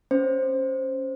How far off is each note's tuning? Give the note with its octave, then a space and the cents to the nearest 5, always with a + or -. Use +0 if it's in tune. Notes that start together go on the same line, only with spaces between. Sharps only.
C#4 +0 C5 +0